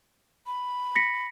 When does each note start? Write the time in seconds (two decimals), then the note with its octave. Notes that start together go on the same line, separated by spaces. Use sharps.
0.47 B5
0.95 A#6 B6 C#7